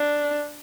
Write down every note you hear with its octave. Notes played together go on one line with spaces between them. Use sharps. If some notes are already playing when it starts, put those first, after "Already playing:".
Already playing: D4